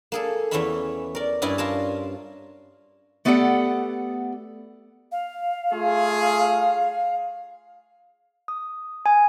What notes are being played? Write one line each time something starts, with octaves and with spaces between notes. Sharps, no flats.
A#3 G#4 A4
E2 E3 C#4 C#5 E5 B5
A#4 D5
G2 C#4 E4 D5 D#5 G#5
F4 A#4 A5
A3 B3 G4 A4 D5 F#5
F5
A3 F4 G#4
D#6
G#5